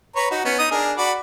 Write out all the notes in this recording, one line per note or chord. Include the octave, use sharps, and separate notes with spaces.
B4 C#5 A#5
D#4 F#4
B3 C#4
D#4 D#6
D4 G#4 A#4
F#4 D5 B5